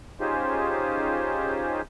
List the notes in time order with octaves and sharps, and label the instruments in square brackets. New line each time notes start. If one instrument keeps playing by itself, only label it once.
[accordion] C#4 D#4 F4 G4 G#4 C5